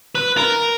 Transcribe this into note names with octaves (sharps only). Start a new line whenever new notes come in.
B4
A#4